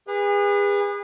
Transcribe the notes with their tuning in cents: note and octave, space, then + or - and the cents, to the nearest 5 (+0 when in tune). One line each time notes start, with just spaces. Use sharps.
G#4 -40 B4 -15